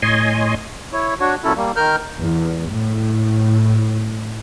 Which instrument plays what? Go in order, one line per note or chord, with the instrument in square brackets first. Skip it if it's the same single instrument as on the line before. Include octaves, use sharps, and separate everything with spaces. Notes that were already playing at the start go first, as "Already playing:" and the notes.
[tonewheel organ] A2 C#5 D#5 G#5 C6
[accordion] E4 C#5
D4 F#4 C#5
A#2 F#3 C#4 E4 A4
G3 A#3
D#3 A#4 F6 G6
[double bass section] E2
A2